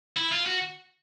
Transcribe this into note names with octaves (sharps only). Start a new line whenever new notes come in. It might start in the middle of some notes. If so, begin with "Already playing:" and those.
E4
F4
F#4